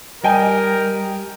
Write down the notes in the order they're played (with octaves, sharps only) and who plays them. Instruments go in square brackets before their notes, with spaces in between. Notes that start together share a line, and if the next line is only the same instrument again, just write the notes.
[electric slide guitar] G3 [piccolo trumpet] A#4 [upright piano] D#5 G5 G#5